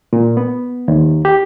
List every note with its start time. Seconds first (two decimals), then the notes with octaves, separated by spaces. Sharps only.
0.13 A#2
0.37 B3
0.88 D#2
1.25 G4